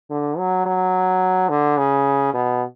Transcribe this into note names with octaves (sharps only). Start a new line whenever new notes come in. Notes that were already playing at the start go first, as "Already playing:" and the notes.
D3
F#3
F#3
D3
C#3
B2